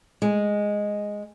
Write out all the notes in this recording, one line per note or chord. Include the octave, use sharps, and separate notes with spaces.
G#3